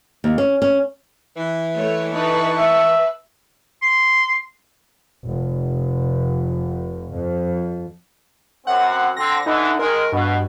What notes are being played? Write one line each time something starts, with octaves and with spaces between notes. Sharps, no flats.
D#2
C#4
C#4
E3
A3 C#5
D#4 A4 B4 A5 C#6
B4 E5
C6
F1
F2
F#2 C4 F#5
D3 C4 A#6
D3 E3 D#4
D#3 G#3 A#4
G2 B2